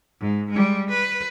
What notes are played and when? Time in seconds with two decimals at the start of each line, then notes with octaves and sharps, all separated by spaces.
0.21 G#2
0.51 G3 G#3
0.89 B4